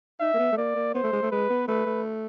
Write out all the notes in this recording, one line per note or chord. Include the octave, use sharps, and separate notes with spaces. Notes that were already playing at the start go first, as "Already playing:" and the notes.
D#4 E5
A#3
B3
A3
A#3 D5
A#3
B3 C5
A3
G#3
A3
G#3 B4
B3
A3 B4
A3